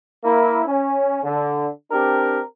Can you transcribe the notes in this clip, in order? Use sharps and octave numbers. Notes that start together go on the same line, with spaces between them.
A#3 E4
C#4
D3
C4 D4 G4 A#4